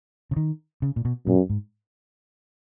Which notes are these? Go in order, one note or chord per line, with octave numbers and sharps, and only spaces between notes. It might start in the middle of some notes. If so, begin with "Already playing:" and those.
C#3
D#3
C#3
A#2
B2
F#2 A#2
G#2